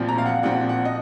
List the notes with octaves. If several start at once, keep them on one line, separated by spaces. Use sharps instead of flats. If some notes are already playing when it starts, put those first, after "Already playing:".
Already playing: A#1 A#2 F3 C4
A#5
F5
F#5
A#1 A#2 F3 C4 F#5
F#5
D#5